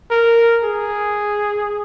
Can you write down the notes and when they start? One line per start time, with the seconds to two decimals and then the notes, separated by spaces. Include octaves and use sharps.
0.11 A#4
0.64 G#4